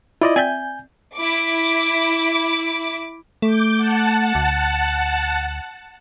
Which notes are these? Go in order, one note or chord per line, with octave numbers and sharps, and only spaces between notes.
E4 F4 D5 D#5
C4 D5 E5 G#5 G6
E4 D6
A3 D6 G6
F#5 A5
D2